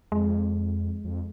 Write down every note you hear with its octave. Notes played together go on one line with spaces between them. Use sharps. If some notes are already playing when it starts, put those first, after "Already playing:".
F2 G#3
F2